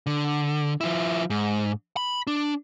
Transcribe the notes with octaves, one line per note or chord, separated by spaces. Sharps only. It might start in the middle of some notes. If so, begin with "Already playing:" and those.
D3
F3 E4
G#2
B5
D4